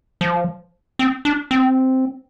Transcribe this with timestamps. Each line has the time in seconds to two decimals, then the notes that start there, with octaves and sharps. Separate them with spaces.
0.21 F3
0.99 C4
1.25 D4
1.51 C4